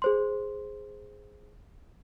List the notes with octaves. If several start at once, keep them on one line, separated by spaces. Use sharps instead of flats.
G#4 C5 C6